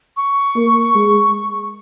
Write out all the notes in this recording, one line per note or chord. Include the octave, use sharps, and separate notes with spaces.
C#6
A#3
G#3